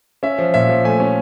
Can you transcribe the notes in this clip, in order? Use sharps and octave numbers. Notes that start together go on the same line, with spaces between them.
C#4 E5
F3
A#2 E5
F3
A3 G#5
C#4